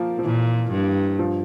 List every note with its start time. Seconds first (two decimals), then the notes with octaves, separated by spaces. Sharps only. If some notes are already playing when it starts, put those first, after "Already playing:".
Already playing: F3 A#3
0.19 F3
0.24 A#2 E3
0.71 G2
1.19 F3